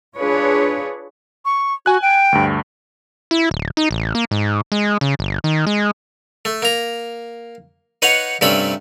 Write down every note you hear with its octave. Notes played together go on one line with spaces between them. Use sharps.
D4 F4 G#4 B4 C#5
C#6
F#4 G#5 F#6
G5
D2 G2
E4
D1
D#4
A1
A#3
G#2
G#3
C#3
G1
D#3
G#3
A3
A#3 A#5
D#4 B4 C#5 F5 F#5
G2 C3 A3 C#4 B5